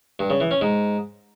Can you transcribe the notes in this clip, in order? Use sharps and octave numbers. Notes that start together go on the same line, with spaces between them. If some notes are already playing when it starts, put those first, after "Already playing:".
G2
C#3
E3
C#4
G#2